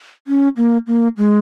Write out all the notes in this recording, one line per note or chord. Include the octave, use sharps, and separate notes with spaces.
C#4
A#3
A#3
G#3